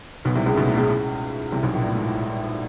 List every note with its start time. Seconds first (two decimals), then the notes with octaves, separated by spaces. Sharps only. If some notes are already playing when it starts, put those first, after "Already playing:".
0.25 B1 B2
0.36 C2 C3
0.46 C#2 C#3
0.57 B1 B2
0.68 A2
0.78 C#2 C#3
1.52 C2 C3
1.63 B1 B2
1.73 A#1 A#2
1.84 A2
1.94 G#2